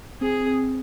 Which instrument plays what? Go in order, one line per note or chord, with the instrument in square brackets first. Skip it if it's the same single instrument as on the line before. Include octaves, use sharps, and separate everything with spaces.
[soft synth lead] C4 [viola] G#4